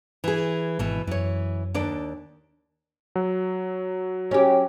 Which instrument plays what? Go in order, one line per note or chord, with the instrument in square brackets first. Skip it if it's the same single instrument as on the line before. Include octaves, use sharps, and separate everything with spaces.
[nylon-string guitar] E3 G#4
[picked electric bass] G#1 [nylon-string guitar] B2 E3
[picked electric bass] F#2 [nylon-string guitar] E3 C#5
[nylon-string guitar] D#2 D4 D5
[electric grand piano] F#3
[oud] C#4 G4